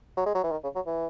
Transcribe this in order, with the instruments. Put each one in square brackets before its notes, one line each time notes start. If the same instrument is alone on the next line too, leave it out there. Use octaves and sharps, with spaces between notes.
[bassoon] F#3
G#3
F#3
E3
D#3
C#3
F#3
E3